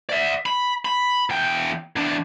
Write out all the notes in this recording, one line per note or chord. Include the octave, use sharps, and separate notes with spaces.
D5 E5
B5
B5
E2 G5
E2 D4